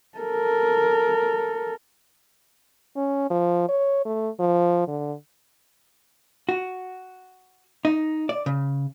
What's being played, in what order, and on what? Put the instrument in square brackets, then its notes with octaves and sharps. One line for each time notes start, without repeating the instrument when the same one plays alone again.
[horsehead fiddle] A4 A#4
[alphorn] C#4
F3
C#5
A3
F3
D3
[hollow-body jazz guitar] F#4
D#4
D5
C#3